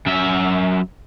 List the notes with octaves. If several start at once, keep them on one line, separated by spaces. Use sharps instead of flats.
F#2 E5